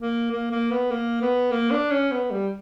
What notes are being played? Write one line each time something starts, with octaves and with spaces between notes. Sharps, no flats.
A#3
A#3
A#3
B3
A#3
B3
A#3
D4
C#4
B3
G3